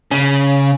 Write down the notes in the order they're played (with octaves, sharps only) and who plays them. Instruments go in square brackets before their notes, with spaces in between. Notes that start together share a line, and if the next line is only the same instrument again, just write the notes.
[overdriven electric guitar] C#3